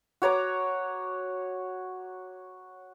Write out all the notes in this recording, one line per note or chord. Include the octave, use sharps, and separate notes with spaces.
F#4 C#5 A#5 D6